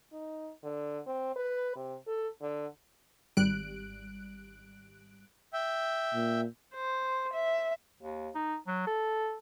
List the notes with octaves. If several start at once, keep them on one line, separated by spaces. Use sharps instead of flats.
D#4
D3
C4
B4
C3
A4
D3
G#1 G3 F#6 D7
E5 G5
A#2
C5
E5
D#2
D#4
F#3
A4